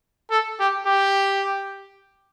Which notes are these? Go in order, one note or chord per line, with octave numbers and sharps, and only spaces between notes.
A4
G4
G4